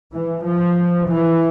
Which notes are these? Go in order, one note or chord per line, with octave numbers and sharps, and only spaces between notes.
E3
F3
E3